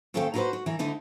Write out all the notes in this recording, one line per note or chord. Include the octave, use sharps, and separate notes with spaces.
D#2 C#4 A4 C5 F5 G5
D#4 E4 F#4 G#4 B4 C5
F#4
E3 A#4
D2 D3 D#4 E4